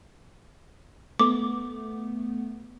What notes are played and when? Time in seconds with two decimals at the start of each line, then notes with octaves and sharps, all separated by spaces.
1.19 A3 B3 D6